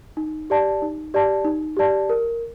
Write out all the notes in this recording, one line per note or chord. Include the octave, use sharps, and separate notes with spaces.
D#4
G4 D5 A5
D#4
G4 D5 A5
D#4
G4 D5 A5
A#4